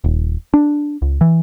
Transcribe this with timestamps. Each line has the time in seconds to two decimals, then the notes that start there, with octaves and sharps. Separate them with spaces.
0.04 D#1
0.54 D4
1.02 C#2
1.21 E3